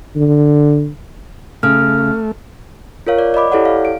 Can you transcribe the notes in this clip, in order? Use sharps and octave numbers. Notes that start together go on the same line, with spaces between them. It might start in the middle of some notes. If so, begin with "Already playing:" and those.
D3
C#3 A3 F6
F4 A#4 C#5 F5
D5
D5 D#5 B5 D6
E4 G4 A4 C#5 D5 F#5
F5
D7